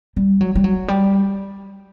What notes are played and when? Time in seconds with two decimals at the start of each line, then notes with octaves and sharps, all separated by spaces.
0.16 G3
0.41 F#3
0.55 G3
0.64 F#3
0.88 G3